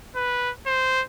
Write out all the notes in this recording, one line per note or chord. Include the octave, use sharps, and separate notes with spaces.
B4
C5